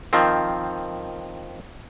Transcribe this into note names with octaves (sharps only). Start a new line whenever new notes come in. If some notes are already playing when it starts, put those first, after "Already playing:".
D#3 F3 C4